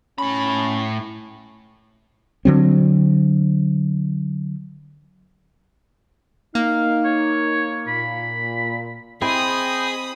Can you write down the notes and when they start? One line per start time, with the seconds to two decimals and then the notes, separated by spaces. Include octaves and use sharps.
0.18 A2 C#4 B5
2.45 D3 F#3 C4
6.55 A#3 D#4 F5
7.05 C#5
7.88 A#2 B5
9.22 C4 E4 G#4 D#5 G5 B5 D#6